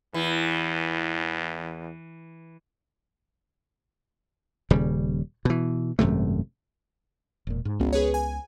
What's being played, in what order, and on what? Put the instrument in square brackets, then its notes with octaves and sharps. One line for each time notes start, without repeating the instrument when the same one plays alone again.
[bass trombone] E2 [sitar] E3
[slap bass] D#1 C#3 G3
B2 E3
G#1 F#2 C3 A3
[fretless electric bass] E1 A#2
G#2
[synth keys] G#1 [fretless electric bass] C#2 B3 C#4
[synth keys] G#4 B4 C#5
G#5